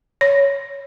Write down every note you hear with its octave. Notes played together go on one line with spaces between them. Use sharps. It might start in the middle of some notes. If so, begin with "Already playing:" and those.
C#5